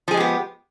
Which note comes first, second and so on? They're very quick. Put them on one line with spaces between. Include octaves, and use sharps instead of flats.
F3 G#4 G#3 G4 B3